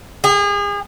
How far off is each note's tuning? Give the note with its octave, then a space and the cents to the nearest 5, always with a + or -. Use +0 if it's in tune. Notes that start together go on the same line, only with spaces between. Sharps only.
G#4 -35